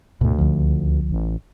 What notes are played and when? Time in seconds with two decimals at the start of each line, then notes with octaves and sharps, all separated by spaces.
0.21 D2 G#2 B2
0.38 C#2 D3 F3
1.11 A1